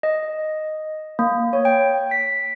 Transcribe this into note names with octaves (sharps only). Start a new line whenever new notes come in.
D#5
A#3
C#5
G5
B6